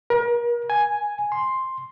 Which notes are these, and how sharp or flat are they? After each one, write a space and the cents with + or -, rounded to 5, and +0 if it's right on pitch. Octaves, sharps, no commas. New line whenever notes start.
A#4 +35
G#5 +5
C6 +5